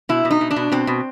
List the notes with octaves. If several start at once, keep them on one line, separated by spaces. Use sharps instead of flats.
B2 E4
B2
D#4
B2
D4
B2
B2 C4
B2